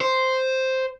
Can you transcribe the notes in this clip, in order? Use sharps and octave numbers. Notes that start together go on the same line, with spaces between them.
C5